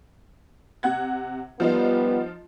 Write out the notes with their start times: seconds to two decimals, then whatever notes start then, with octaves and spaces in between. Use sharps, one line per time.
0.83 C3 F#5 G#6
1.60 F3 G3 B3 D#4 F4